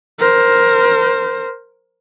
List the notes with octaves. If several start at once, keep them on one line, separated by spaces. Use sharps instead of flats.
A#4 C5